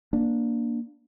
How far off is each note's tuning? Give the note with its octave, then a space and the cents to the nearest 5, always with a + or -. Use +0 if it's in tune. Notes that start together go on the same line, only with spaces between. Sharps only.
A#3 +10 D4 +0